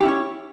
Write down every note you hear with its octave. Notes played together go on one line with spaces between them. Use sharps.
C#4 E4 G4 C#5